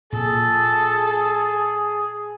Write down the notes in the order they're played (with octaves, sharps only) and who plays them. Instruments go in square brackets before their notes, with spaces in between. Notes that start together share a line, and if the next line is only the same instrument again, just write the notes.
[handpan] A#2 [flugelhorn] G#4 [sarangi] A4